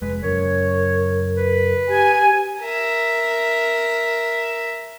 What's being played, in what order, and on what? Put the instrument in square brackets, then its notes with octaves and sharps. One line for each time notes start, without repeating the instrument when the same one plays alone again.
[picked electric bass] F1 G#3 [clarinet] B4
[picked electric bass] F#2 C#3 [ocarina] A#4 [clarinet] C#5
[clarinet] B4
[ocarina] G4 [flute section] G#5
[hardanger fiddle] A#4 E5